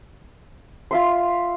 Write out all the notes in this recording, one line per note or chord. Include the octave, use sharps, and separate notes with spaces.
F4 E5 C6